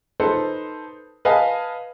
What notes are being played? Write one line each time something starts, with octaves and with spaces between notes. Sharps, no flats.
D#4 A4 B4 C5
B4 D#5 F5 G#5 A5